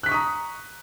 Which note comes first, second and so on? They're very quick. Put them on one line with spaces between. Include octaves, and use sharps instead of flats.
F#6 B6 C#6 D#6 A#5